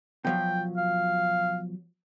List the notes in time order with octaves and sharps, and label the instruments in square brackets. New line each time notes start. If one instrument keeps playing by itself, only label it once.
[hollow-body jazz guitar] B2 F3 F#3 [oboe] G5
[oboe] F5